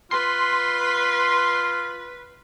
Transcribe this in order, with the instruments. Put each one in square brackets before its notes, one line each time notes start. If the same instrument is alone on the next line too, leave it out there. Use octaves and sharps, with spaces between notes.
[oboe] F4 [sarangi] B4 [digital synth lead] C6